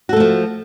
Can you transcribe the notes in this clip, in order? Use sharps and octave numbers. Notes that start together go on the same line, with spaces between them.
F3 A3 F#4 A4